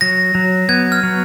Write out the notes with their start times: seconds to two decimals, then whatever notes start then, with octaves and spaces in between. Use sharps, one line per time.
0.01 F#3 A#6
0.35 F#3
0.69 B3 G#6
0.92 F6
1.03 F#3